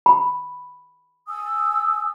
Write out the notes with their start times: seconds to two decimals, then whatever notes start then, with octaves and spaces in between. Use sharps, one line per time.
0.06 B5
1.28 G#5 D#6 E6